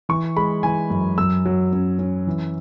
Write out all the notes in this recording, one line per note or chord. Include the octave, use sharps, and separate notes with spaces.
E3 C#6
G#3 B5
E3 G#5
F#2
F#2 E6
F#3
C#4
C#4
E3